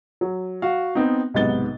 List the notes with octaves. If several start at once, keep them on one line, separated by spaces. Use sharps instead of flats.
F#3
F#4 F5
B3 C4 D#4
B1 G#2 C3 B3 A6 G7